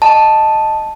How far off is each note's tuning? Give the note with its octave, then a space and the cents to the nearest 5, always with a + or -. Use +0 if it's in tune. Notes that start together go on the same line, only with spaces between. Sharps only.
D#5 +0 A5 +0